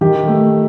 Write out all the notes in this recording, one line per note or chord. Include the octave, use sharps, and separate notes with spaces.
D#3 G4
A3